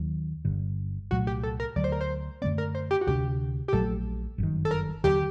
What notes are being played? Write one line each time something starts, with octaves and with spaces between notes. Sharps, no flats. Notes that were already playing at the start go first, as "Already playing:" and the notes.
Already playing: D#2 D#3 F#3
G1 G2 D3
C2 A#2 F#3 A3 F#4
G4
A4
A#4
D2 D3 F#3 A3 D5
C5
A#4
C5
F#2 D3 A3 C4 D5
A#4
C5
G4
F#4
D2 C3 G3 D4 G4
G4
A#1 A#2 F#3 A3 A4
G1 F#2 D#3
A4
A#4
D#2 D3 F#3 G4